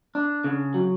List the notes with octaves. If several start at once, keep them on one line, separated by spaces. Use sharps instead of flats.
D4
C#3
F#3